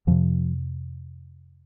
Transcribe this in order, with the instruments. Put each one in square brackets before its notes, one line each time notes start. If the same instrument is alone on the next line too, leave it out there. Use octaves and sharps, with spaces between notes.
[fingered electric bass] F2 C3 F3